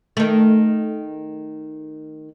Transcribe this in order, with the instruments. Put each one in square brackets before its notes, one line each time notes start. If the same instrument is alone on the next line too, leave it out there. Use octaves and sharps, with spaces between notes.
[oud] D#3 A3